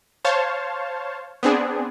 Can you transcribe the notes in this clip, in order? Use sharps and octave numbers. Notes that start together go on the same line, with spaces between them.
C5 C#5 F5 A5
B3 C4 D4 G#4